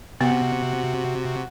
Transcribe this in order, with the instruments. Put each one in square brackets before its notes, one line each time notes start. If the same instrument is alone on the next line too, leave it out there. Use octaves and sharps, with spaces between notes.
[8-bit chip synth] C3 [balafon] B3 [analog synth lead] F#4 [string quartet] F#5